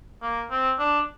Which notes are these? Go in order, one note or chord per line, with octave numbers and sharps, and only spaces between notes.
A#3
C4
D4